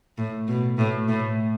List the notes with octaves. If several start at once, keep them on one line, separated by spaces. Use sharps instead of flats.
A2
B2
A2
A2